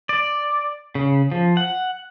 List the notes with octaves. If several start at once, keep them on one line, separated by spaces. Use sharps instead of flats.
D5
C#3
F3
F#5